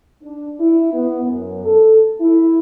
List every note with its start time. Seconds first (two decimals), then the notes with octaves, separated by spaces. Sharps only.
0.22 D4
0.59 E4
0.92 B3
1.22 F#2
1.64 A4
2.20 E4